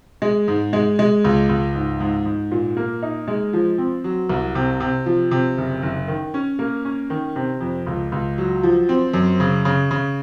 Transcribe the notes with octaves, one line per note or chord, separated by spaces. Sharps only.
G#3
G#2
G#3
G#3
C#2
C#2
G#2
G#2
G#2
A#2
A#3
D#4
G#3
F3
C4
F#3
C2
C3
C3
F3
C3
F#1
F#1
D#3
C#4
A#3
C#4
D#3
C3
F2
C#2
C#2
F#3
F3
C4
F#2
C#3
C#3
C#3